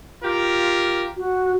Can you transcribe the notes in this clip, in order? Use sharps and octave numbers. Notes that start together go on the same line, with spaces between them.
F4 G4 A#4
F#4